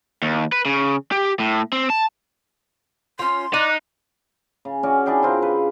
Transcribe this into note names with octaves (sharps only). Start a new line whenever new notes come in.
D#2
B4
C#3
G4
A2
C4
A5
C#4 F4 C6
D#4 D5 F#6
C#3
C#4 F#4 D5
D4 E4 G#4 G5
C#3 C4 F4 A#4
B4